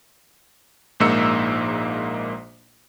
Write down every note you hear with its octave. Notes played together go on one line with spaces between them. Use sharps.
A#1 G#2 A#3 D#4 E6 C#7